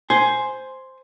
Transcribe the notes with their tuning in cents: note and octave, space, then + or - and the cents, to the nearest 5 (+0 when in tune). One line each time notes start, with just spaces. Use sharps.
C5 +0 G#5 +10